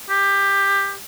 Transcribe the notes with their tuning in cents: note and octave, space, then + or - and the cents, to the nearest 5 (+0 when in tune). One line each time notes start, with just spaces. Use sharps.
G4 +15